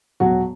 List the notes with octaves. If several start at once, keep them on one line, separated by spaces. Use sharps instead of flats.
E1 F#3 F#4